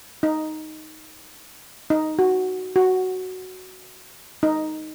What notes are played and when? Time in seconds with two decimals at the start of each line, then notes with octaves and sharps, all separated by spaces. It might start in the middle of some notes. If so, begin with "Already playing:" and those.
0.23 D#4
1.90 D#4
2.19 F#4
2.76 F#4
4.43 D#4